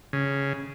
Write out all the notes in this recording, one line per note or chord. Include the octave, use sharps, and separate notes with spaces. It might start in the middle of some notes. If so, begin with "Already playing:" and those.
C#3